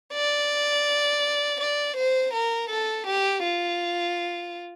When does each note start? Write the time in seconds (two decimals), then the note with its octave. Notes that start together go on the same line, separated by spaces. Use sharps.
0.14 D5
1.60 D5
1.96 C5
2.33 A#4
2.70 A4
3.07 G4
3.44 F4